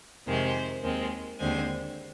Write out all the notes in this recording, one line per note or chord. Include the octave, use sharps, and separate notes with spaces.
F2 C3 D#3 G#3 C5
D#2 D#3 G#3 C4
D#2 D3 G#3 C4 G#5